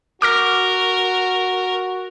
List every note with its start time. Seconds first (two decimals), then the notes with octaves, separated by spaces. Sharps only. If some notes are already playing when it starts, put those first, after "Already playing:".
0.22 F#4 A#4 D6 F6 A#6